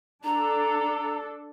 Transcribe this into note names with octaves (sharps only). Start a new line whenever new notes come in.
D4 A4 A#5